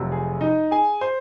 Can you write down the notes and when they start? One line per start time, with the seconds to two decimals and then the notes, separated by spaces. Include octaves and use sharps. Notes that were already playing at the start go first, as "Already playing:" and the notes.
Already playing: F1 F2 C3 F#3
0.12 G#4
0.41 D#4 D#5
0.71 G#4 G#5
1.01 C5 C6